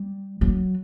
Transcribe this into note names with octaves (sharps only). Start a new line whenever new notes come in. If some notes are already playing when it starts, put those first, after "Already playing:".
Already playing: G3
F#3